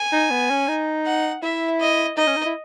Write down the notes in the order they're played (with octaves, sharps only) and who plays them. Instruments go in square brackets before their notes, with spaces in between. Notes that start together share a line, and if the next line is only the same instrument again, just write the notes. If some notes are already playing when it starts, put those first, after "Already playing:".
Already playing: [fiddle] G#5
[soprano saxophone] D#4
B3
C#4
D#4
[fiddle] F#5
[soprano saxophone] E4 [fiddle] E5
[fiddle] D#5
[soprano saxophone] D#4 [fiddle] D#5
[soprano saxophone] C#4
D#4
E4